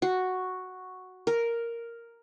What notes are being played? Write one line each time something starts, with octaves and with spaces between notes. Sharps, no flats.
F#4
A#4